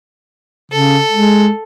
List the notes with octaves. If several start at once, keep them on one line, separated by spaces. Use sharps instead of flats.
C#3 A4
G#3